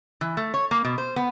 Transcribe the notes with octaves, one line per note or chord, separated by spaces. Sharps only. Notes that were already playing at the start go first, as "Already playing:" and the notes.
E3
A3
C#5
A#3
B2
C5
B3